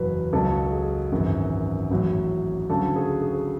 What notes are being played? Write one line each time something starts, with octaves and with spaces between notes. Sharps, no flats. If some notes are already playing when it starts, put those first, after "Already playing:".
Already playing: F#1 E2 B2 F#3 B4
C#2 B2 F#3 A4
G#4
G#1 F#2 E3
A1 A2 F#3
D2 C#3 F#3 A4
G#4
G#4